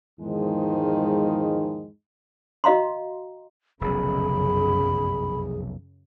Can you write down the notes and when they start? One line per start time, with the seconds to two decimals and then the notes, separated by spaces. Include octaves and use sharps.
0.20 E2 G#2 D#3 F3 G#3 D#4
2.64 F#4 D#5 F5 A#5 C6
3.81 F1 B1 F#2 C#3 G#4 B5